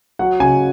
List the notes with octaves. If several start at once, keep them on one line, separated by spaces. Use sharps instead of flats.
F#3 F#5
C#3 G#5